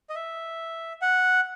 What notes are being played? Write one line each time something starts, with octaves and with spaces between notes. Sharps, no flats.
D#5
E5
F#5